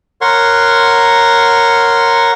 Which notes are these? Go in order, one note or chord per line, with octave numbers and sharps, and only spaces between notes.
A#4 C#5 F#5 C6 C#6